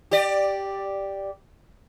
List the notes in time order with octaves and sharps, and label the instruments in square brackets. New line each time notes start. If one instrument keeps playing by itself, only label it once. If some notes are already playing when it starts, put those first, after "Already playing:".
[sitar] G4 D5